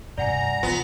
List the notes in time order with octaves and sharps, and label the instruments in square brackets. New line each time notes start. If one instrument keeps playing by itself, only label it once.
[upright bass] G2 C3 [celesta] D5 F#5 G#5 [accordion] A#5
[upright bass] C2 [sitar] B3 [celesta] F4